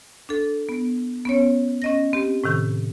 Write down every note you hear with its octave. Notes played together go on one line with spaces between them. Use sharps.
D4 A4
B3
B3 C#4 C#5
C#4 D#5 A#6
C4 G4
A2 C3 D#3 G6